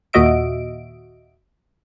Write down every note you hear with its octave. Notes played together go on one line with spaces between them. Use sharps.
D#2 A#2 F#4 D#5 E5 D7